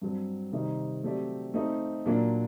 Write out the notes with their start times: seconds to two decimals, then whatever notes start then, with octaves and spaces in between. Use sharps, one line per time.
0.02 G2 F#3 C4
0.53 C3 D#3 G3 C4 D#4
1.03 F#3 A3 C4 G4 D5
1.54 A3 C4 D#4
2.06 A#2 F#3 A#3 D4